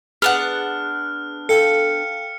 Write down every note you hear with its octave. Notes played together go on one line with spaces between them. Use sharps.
B3 D4 G#4 F#5 F6
A4 F5 G5 C#7